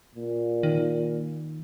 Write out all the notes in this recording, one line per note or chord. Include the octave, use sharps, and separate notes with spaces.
A#2
D#3